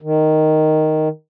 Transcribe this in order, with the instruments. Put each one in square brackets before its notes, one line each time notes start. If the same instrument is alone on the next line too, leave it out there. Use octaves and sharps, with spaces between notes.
[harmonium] D#3